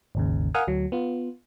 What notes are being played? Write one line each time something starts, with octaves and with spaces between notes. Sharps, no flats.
G#1 D#2 C#3
A#4 F5 F#5 G#5 D#6 F6
D2 F#3
B3 F4